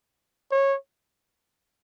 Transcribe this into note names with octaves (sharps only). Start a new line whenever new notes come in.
C#5